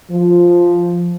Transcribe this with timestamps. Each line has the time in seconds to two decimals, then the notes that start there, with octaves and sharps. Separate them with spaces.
0.10 F3